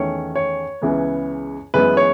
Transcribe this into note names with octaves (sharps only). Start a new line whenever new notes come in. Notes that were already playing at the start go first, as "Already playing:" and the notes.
Already playing: E2 D#3 A3 C#4 C#5
C#5
C#2 C#3 E3 B3
F#2 E3 G#3 B3 B4
C#5